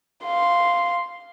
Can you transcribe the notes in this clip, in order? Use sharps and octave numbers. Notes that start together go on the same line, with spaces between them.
F5 C6